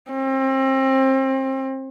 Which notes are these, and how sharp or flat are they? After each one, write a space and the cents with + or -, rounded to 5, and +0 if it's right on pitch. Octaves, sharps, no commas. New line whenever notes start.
C4 +30